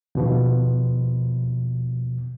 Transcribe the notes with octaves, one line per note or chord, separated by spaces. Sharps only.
D#2 B2 F3